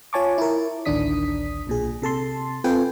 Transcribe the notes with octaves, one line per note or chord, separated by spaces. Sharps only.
F4 C#5 G#5 A5 C#6 D6
E4 A#4
A1 D2 D#3 D4 D#6 B6
B1 A#2 G#4
C3 A4 A5 C6
C4 F4 A4 B4 G5 G#5